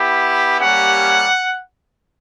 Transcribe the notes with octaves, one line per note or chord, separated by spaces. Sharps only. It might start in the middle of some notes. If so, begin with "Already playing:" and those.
Already playing: B3 E4 G4
G3 A#3 C#4 G4 F#5